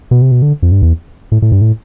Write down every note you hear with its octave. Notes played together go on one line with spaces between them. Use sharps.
B2
C3
B2
D3
F2
G2
E2
A2
A2
G2
A2